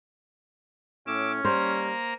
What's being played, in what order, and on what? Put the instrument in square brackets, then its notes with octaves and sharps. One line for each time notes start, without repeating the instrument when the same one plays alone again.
[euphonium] A2 [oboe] C#4 [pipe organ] D6 E6
[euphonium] G3 [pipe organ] A#3 A#5 [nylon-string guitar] C5